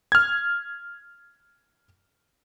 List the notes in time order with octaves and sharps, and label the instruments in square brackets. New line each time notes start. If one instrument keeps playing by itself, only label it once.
[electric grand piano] F6 G#6